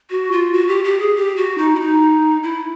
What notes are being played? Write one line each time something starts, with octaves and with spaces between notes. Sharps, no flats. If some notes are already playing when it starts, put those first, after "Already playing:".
F#4
F4
F#4
G4
G4
G#4
G4
F#4
D#4
E4
D#4
E4